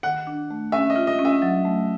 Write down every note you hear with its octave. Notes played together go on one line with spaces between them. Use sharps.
D#3 F#5
D4
A3
C#4 E5
D#5
F4
D#5
C#4
E5
F#3
A3